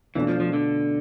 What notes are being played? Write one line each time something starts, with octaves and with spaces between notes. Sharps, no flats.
B2 E3 A3 D4 F4
F3
F3
D3